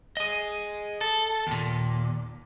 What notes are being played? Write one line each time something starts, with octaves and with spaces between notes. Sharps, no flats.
G#4 D#5
A4
D#2 A#2